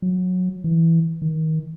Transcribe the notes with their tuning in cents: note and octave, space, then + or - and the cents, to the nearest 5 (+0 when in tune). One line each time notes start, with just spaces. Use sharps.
F#3 -20
E3 +0
D#3 +25